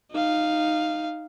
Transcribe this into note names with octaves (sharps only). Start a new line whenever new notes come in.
D#4 F5